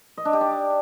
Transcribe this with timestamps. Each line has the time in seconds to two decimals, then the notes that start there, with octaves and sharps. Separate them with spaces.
0.17 D#5
0.25 D4
0.33 G4
0.41 D5